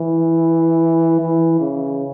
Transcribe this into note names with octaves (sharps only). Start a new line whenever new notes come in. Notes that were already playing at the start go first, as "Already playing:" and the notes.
Already playing: E3
E3
C#3